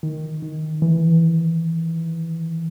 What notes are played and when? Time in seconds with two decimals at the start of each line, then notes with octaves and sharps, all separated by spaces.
0.03 D#3
0.42 D#3
0.82 E3